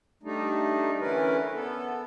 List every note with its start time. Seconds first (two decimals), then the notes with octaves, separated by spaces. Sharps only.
0.23 G3 A3 D4 D#4
1.00 D3 E3 C#4 A#4 B4
1.54 B3 A4